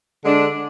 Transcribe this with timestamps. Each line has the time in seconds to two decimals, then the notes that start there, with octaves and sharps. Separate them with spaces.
0.24 D3 G#3 D4